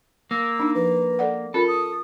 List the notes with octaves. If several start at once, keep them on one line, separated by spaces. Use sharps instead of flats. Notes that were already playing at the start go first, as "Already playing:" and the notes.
A#3 E6
D4 D#4
F3 B4
A4 D5 F#5
C#4 F4 A4 A#4 B5
D#6